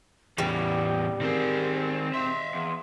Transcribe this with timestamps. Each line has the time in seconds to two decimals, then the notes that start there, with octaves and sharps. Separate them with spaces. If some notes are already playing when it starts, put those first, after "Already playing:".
0.38 E2 A2 C#3 E3 G3 G5
1.21 D#3 C4 G#4 A#4
2.14 E5 F5 C6
2.54 E2